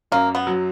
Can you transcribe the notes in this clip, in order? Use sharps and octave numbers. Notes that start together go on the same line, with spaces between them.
F#2 A#3
B3
F#3